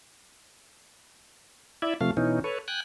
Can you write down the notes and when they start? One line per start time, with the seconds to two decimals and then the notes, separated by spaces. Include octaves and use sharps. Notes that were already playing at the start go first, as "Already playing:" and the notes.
1.82 E4 D5 E5
2.01 C3 F3 A3 F5
2.17 B2 E3 C#4 D#4
2.44 A4 B4 C#5
2.68 G5 G#5 F#6